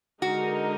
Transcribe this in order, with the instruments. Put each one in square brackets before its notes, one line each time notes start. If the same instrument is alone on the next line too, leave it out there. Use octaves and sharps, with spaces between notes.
[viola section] D3 G#3 D#4 A#4 [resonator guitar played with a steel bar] F#4